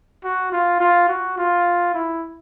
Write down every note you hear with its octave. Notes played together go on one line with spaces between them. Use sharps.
F#4
F4
F4
F#4
F4
E4